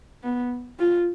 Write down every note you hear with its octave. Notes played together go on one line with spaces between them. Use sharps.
B3
F4